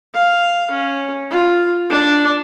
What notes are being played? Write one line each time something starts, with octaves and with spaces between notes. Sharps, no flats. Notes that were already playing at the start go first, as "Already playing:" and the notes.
F5
C#4
F4
D4